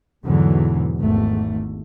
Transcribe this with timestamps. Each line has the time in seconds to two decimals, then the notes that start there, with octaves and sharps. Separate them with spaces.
0.24 E2 G#2 B2 D3 E3 F#3
0.99 G#1 E2 A3